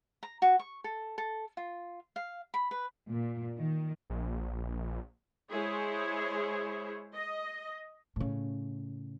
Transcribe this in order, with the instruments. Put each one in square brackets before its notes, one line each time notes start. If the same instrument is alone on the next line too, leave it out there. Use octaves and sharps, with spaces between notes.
[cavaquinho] A#5
F#4
C#6
A4
A4
F4
F5
B5
B4
[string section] A#2
D#3
[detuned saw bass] A#1
[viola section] G#3 E4 G#4 C5 C#5
D#5
[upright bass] A2 C#3